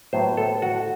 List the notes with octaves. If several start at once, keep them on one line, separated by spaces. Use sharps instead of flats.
A2 F#3 B3 C5
A4
F#4